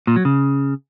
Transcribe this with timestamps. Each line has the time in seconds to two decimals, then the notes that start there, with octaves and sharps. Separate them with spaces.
0.07 A#2
0.16 F#3
0.25 C#3